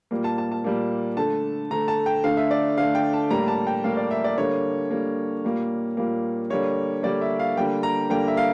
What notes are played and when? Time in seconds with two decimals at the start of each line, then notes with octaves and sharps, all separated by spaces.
0.11 A#2 G3 A#3
0.24 A5
0.38 A5
0.52 A5
0.64 A#2 G3 A#3
1.17 D3 A3 A5
1.71 D3 A3 A#5
1.88 A5
2.06 G5
2.24 D3 A3 F5
2.37 E5
2.51 D5
2.78 D3 A3 F5
2.95 G5
3.13 A5
3.30 A2 G3 A#3 A#5
3.48 A5
3.67 G5
3.84 A2 G3 A#3 F5
3.97 D5
4.11 E5
4.24 D5
4.38 D3 G3 A#3 C#5
4.91 D3 G3 A#3
5.44 A#2 G3 A#3
5.97 A#2 G3 A#3
6.50 D3 G3 A#3 C#5
7.03 D3 G3 A#3 D5
7.21 E5
7.39 F5
7.56 D3 G3 A#3 G5
7.83 A#5
8.10 D3 G3 A#3 G5
8.28 E5
8.37 F5